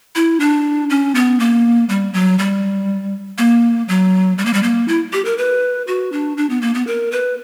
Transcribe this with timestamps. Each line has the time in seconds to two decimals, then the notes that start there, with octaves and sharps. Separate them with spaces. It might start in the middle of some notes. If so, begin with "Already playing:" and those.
0.15 E4
0.40 D4
0.90 C#4
1.15 B3
1.40 A#3
1.89 G3
2.14 F#3
2.39 G3
3.38 A#3
3.88 F#3
4.38 G3
4.46 A#3
4.53 G3
4.63 A#3
4.88 E4
5.13 G4
5.25 A#4
5.38 B4
5.87 F#4
6.12 D4
6.37 D4
6.50 B3
6.62 A#3
6.74 B3
6.87 A#4
7.12 B4